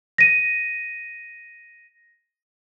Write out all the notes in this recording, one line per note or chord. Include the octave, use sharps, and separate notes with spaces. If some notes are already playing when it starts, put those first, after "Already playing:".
A#6 D#7